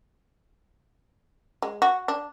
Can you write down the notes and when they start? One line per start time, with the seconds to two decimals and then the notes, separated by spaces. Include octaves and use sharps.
1.62 G#3
1.82 F#4
2.08 D4